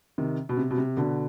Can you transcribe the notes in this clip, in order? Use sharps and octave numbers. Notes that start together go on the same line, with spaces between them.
C3 D#3
B2
C3
B2
C3
B2 D3